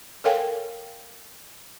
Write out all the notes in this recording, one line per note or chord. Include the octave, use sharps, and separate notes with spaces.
A4 A#4 C#5 F5 G5 G#5